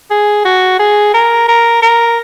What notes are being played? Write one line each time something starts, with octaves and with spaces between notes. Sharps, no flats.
G#4
F#4
G#4
A#4
A#4
A#4